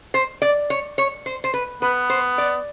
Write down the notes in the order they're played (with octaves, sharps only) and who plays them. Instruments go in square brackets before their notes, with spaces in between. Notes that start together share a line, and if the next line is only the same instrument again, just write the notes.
[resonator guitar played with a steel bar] C5
D5
C#5
C#5
C5
C5
B4
[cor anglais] B3 [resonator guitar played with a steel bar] B4
[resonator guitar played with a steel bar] C5
D5